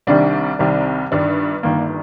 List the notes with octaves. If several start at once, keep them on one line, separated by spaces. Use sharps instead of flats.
C2 C3 D#3 G3 D4
C2 C3 D#3 G3
G1 G2 D#3 D4
G1 G2 D#3 A#3